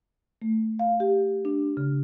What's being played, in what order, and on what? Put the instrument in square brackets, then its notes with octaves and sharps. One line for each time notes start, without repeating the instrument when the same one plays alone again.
[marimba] A3
F5
G4
D4
C#3